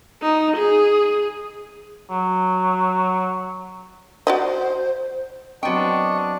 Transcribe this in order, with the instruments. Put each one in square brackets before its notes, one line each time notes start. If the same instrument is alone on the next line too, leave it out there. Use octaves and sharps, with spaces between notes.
[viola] D#4
G#4
[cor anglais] F#3
[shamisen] F#4 D5 D#5 [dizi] C5
[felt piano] F#3 C4 [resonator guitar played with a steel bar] B3 G5 [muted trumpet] D4 [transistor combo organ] D#5 C#6